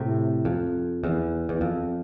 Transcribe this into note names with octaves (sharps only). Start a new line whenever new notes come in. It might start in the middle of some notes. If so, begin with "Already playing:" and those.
Already playing: A2 C3
F2
E2
E2
F2